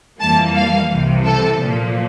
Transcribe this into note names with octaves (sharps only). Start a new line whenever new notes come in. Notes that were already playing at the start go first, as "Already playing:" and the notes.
F2 E3 G3 A#3 A5
F5
C2 C3 E3
A4
A#2 F3 A#3